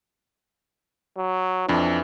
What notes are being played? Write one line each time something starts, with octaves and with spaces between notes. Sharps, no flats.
F#3
F2 E3 D4